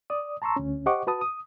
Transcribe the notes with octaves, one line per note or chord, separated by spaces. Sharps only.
D5 D#6
A5 A#5 C6 C#6 E6
D2 C#4
G4 C5 D#5 F#5 C#6 D6
F#4 B4 A5 D#6
D#6